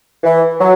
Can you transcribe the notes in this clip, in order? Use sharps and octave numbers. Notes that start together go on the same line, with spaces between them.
E3
F#3